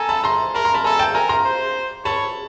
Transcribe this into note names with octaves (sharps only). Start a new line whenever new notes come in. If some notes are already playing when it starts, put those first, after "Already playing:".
Already playing: A4 G#5 A#5
A5 B5
A#5 C6
A#4 A5 B5
A#5 C6
A5 B5
A4 G#5 A#5
G5 A5
A#4 G#5 A#5
A#5 C6
C5
C#5 A5 B5